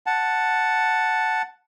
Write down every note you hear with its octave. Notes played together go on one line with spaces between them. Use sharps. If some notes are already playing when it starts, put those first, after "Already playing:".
F#5 A5